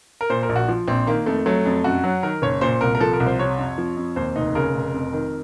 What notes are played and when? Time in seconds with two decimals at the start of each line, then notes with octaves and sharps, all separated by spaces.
0.21 A#4
0.30 A#2 C5
0.43 A#4
0.49 A#1
0.56 F#4
0.69 F3
0.88 A#1 C4
1.07 D#3 A#3
1.26 F2 A3
1.46 F#3 A3
1.66 F2
1.84 F#2 F#4
2.04 F#3
2.23 D#3 A#4
2.42 F#1 C#5
2.61 A#2 C5
2.81 C2 A#4
2.95 A#4
3.00 F3 A4
3.13 A#4
3.20 C2
3.27 C5
3.39 C3 C#5
3.58 F2
3.78 F3
3.97 F2
4.16 D#2 C5
4.36 F1 D#4
4.55 C#3 A#4
4.75 F1
4.94 F2
5.13 D#3